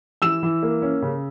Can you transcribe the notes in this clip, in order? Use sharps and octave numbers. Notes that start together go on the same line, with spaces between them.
E3 E6 E7
E3
A#3
C#4
C#3